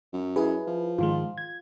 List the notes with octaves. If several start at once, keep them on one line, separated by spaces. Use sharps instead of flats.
F#2
E4 G#4 B4
F3
G#2 D#3 G#3 F4
G#6